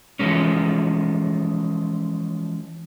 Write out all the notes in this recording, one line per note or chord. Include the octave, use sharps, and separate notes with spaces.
E3 F3 G#3 C#4